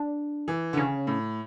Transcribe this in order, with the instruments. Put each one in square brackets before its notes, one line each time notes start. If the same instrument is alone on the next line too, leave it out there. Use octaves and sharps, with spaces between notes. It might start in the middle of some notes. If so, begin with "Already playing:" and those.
Already playing: [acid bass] D4
[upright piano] E3
D3
[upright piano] C#3 [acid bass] C#4
[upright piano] A2